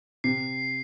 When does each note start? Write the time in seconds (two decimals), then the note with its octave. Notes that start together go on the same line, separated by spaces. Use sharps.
0.24 C3 C7